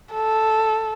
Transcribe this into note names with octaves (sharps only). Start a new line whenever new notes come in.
A4